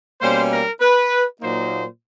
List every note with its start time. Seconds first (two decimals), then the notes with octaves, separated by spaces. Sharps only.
0.20 B2 G3 A#3 C#4 C5
0.50 A#4
0.80 B4
1.40 A#2 F#3 A#3 D#4 C5